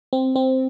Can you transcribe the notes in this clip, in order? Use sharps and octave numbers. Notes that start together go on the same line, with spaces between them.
C4
C4